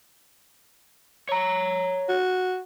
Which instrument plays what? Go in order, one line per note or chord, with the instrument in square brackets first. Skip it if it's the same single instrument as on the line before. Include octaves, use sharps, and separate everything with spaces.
[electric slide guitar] C#5 A#5
[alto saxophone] F#4